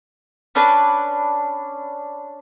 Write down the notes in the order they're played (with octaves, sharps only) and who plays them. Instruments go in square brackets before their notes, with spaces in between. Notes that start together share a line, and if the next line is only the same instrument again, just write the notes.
[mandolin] C#4 D4 B4